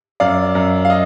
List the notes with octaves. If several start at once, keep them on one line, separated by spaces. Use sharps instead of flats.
F#2 D5 F5
F#2
F5
D#5